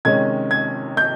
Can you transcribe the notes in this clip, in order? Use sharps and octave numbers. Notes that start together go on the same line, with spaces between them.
C3 D#3 G#3 C#4 G#6
G#6
G6